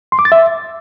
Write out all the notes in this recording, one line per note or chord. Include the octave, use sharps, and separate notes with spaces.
C6
D6
A6
E5